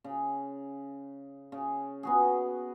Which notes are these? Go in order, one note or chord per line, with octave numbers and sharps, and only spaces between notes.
C#3
C#3
B3 F#4 G#4